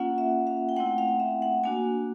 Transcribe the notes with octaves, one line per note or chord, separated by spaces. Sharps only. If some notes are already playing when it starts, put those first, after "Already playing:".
Already playing: A#3 C#4 F4 F#5
E5
F5
G5
A3 C4 E4 F#5
F5
E5
F#5
A#3 D4 F#4 G#5